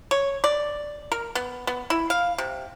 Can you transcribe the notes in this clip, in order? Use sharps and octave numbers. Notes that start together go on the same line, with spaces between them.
C#5
D5
A#4
B3
B3
E4
F5
C3